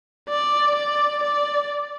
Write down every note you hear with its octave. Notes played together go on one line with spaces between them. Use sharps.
D5
D5
D5